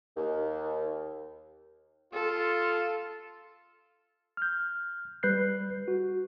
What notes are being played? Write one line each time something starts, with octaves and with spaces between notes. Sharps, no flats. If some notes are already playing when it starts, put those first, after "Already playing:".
D#2
F4 A4
F6 G6
G3 B4 F#6 G6 C7
F#4